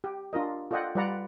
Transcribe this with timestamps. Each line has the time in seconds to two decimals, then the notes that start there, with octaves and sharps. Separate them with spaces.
0.04 G4
0.33 D4 F4 A#4 D#5
0.71 F4 A4 D5 D#5 F#5 G5
0.95 G3 F4 B4 D5 F#5 A#5